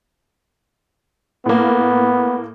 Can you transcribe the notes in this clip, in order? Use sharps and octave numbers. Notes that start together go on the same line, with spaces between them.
A2 A#3 B3